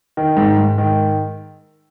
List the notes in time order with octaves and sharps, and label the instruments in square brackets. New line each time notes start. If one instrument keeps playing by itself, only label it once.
[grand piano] D#3
G#2
G#2
D#3